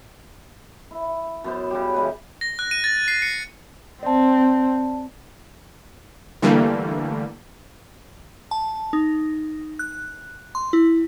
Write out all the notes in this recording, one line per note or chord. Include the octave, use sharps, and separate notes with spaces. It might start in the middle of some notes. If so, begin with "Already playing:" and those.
E4
F#2 B3 C5
C#3 G3 G4
E3 G#3 B4
A#6
F#6
D#7
A6
C7
C#7
C4 D5 A5
D3 E3 G3 A3 A#3
A5
D#4
F#6
C6
E4